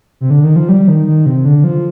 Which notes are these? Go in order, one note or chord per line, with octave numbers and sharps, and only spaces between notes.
C3
D3
D#3
F3
G3
D#3
D#3
C3
D3
F3